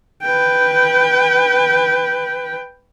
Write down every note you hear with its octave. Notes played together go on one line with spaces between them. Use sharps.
B4 G5